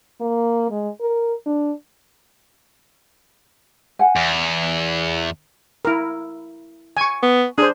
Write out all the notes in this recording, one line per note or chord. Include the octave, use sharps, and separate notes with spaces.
A#3
G#3
A#4
D4
F#5 G#5
E2
E4 A#4
G#5 C#6
B3
D4 G#4 C5